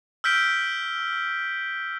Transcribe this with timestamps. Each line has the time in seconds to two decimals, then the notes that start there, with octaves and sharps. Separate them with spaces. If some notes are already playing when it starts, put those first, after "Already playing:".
0.24 E6 F6 G6 B6 D7 G7